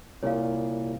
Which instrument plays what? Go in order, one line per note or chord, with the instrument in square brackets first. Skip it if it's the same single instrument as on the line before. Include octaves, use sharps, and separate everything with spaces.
[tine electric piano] C2 A#2 [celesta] C#5 F5